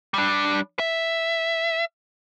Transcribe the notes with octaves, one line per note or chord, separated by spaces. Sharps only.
G3 D4
E5